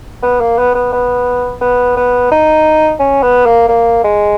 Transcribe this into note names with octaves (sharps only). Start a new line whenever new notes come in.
B3
A#3
B3
B3
B3
B3
B3
D#4
C#4
B3
A#3
A#3
G#3